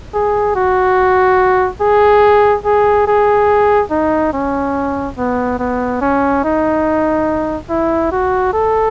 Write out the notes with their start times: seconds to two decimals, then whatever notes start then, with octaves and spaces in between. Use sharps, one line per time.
0.14 G#4
0.56 F#4
1.81 G#4
2.65 G#4
3.07 G#4
3.91 D#4
4.33 C#4
5.18 B3
5.59 B3
6.01 C#4
6.44 D#4
7.69 E4
8.12 F#4
8.53 A4